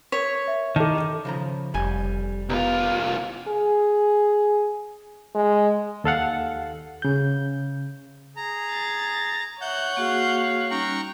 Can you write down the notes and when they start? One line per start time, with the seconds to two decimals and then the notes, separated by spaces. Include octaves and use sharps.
0.12 A#4 C#5 B6
0.48 E5
0.76 D#3 D#4 A4 A5 D6
1.25 C#3 F3 A#5
1.74 F1 G3 G#5
2.49 C2 B3 F4 G4
3.48 G#4
5.35 G#3
6.04 D#2 A4 F5 F#5
7.02 C#3 G6
8.37 G#4 A#5
8.71 A6
9.61 C#5 E5 F#5 F#6 G6
9.97 A#3 F#4 G#4 F5
10.71 G3 C#4 D#4 G5 A#5 C#6